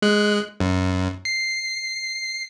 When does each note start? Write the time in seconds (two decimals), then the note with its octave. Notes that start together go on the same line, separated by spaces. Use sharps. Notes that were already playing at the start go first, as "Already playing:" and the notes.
0.02 G#3 F#6
0.60 F#2
1.25 C7